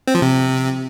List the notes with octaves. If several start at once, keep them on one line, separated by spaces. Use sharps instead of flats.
C4
F3
C3